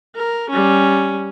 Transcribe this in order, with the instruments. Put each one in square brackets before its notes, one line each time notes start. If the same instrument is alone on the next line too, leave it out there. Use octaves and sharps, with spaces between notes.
[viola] A#4
G3 C#4